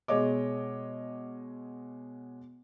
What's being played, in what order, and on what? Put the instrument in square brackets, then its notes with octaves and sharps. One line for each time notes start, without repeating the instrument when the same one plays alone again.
[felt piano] B2 G#3 C#5 D#5 D6